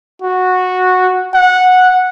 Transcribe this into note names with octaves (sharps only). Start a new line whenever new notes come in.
F#4
F#5